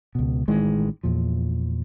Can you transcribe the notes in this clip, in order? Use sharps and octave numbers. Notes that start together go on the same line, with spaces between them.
C#2 B2
A1 D#3 E3 G#3
E2 A#2 F3